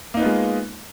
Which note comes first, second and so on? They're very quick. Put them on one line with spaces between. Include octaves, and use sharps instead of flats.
A#3 D#4 B3 F4 G#3